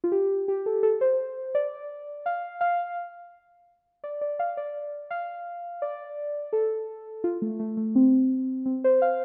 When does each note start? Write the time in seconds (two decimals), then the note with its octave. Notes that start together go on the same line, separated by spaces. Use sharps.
0.04 F4
0.12 G4
0.48 G4
0.66 A4
0.83 A4
1.01 C5
1.55 D5
2.26 F5
2.61 F5
4.04 D5
4.21 D5
4.39 F5
4.57 D5
5.10 F5
5.82 D5
6.53 A4
7.24 F4
7.42 A3
7.60 A3
7.77 A3
7.95 C4
8.66 C4
8.84 C5
9.02 F5